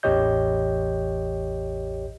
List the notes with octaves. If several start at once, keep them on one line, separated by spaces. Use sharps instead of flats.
A1 E2 G4 C#5 D#5 G6